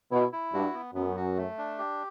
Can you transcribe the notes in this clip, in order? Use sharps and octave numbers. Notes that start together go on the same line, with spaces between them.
B2 E4
E4
G2 F#4
B3
F#2 B3
F#4
A3
D4
G4